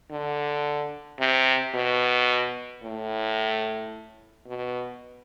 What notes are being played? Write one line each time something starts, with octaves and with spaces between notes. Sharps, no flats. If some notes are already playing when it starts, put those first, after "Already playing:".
D3
C3
B2
A2
B2